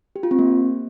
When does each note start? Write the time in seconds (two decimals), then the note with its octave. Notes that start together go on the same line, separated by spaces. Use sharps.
0.16 G4
0.23 F4
0.31 C4
0.39 A#3